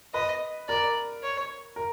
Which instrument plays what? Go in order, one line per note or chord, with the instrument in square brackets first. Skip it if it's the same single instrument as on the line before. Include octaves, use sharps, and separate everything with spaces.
[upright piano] B4 [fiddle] D#5
[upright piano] A#4 [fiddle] D5
[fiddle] C#5
[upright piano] A#4